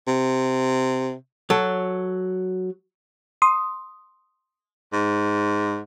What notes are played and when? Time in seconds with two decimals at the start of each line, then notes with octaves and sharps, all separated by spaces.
0.07 C3
1.50 F#3 A4
3.42 C6 D#6
4.93 G#2